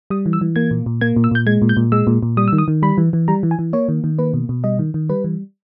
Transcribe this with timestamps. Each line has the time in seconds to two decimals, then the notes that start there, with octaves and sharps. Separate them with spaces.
0.10 G3 D#6
0.26 E3
0.33 E6
0.41 E3
0.56 A#3 G#6
0.71 A#2
0.86 A#2
1.01 A#3 G#6
1.16 A#2
1.24 E6
1.31 A#2 G6
1.47 G#3 G#6
1.62 A#2
1.69 G6
1.77 A#2
1.92 G#3 E6
2.07 A#2
2.23 A#2
2.37 G3 D#6
2.48 E6
2.53 D#3
2.58 D#6
2.68 D#3
2.83 G3 B5
2.98 E3
3.13 E3
3.28 G3 A#5
3.43 E3
3.51 G#5
3.59 E3
3.73 A#3 C#5
3.89 D#3
4.04 D#3
4.19 A#3 B4
4.34 B2
4.49 B2
4.64 G3 D#5
4.79 D#3
4.94 D#3
5.09 G3 B4
5.24 E3